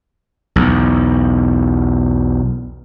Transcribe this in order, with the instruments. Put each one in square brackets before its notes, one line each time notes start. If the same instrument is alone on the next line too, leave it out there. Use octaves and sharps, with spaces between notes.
[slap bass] B1 E2